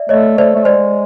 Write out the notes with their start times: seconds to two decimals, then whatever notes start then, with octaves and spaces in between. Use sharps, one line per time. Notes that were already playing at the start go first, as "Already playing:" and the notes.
Already playing: D5 E5
0.09 A3 C#5 D#5
0.38 A3 C5 D5
0.55 A3
0.65 G#3 C5 D5